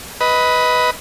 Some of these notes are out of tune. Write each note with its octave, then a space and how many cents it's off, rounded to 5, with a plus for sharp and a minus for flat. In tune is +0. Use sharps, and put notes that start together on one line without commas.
B4 +0 D#5 +20